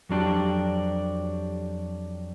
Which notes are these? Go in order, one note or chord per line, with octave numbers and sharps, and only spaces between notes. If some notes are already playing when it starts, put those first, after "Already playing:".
F2 F#3 D4 G4